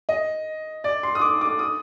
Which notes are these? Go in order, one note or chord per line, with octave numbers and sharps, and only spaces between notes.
D#5
D5
C6
D#6
D6
D6
D#6